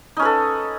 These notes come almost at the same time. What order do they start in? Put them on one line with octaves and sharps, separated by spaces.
D#4 C#4 B4 A4